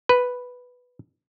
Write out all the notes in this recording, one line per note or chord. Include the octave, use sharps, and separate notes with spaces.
B4